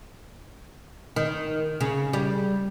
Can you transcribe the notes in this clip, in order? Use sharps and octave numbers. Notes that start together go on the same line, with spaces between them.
D#3
C#3
G3